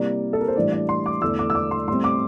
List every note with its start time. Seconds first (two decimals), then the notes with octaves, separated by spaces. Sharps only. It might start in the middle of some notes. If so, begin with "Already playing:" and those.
Already playing: C3 G3 A#3 E4 D5
0.33 A4
0.40 A#4
0.48 C5
0.56 A2 E3 G3 D4 D5
0.72 D5
0.89 C6
1.06 D6
1.21 E2 D3 A3 E4 E6
1.39 D6
1.50 E6
1.55 D6
1.71 C6
1.87 A2 G3 C4 C6
2.04 D6